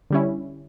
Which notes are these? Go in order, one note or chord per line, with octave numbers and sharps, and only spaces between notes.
D3 G3 C#4 E4